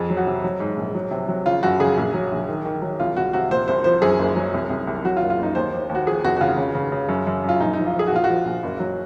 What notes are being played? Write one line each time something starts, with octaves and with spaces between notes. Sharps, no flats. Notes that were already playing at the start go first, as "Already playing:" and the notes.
Already playing: F2 G#4
F#3
F#4
C3
F#3
G#2
A#1
F#3
C3
F#3
C#3 F4
F#2 F#4
C#3 G#4
A#1
F#3
A#1
D#3
D#3
F#3
C2 F4
C2 F#4
C3 F#4
A#2 C5
C2 C5
F3 C5
F#2 G#4
F#1
F#3
C2
C2
C2
F#3 F#4
F4
F#1
F4
F#1 D#4
D#2 C5
D#2
D#2
F#4
F3 G#4
F1 F#4
F#4
C#3 F4
C#3
C#3
C#3
F#2
F#2
F#2 F4
A#1 D#4
F3 D#4
F4
F3
G#4
F#4
A#1 F4
F#4
F3
A#1
F#1
F#3